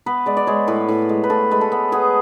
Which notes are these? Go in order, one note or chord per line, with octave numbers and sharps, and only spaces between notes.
B3 B4
G#3 D5
D5
G#3 C#5
A2 B4
A2
G#3
B4
A2 A4
G#3 B4
A4
B3
B3 G#4